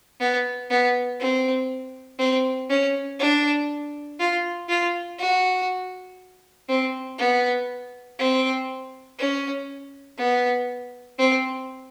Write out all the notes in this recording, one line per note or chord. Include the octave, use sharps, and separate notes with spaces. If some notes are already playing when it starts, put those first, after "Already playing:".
B3
B3
C4
C4
C#4
D4
F4
F4
F#4
C4
B3
C4
C#4
B3
C4